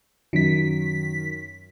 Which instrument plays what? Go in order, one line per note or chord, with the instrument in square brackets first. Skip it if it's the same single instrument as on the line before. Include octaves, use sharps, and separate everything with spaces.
[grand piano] F#2 [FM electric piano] D#3 B6